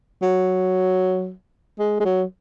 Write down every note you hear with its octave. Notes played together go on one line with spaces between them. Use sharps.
F#3
G#3
G#3
F#3